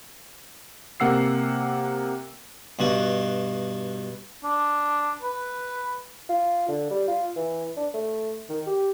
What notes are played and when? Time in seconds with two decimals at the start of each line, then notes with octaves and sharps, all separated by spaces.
1.00 C3 A#3 F#5 E6 C7
2.79 G2 B2 F#4
4.44 D4
5.21 B4
6.29 F4
6.68 D3
6.90 G3
7.08 F4
7.36 E3
7.77 D4
7.94 A3
8.49 D#3
8.67 G4